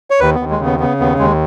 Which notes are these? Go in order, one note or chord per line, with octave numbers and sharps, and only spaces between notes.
C#5
D#2 B4
D#2 B3
G#3
C#3
B3
C#3 B3
D#2 B3
D#2 G#3